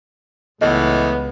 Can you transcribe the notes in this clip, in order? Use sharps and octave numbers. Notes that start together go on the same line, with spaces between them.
C#2 A2 E3 B3 D#5